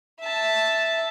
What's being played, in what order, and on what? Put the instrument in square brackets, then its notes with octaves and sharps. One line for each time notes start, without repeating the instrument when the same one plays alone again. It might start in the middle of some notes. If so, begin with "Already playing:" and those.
[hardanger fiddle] E5 A5